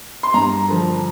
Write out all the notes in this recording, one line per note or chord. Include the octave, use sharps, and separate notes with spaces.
C6
G2 A#5
D3 F3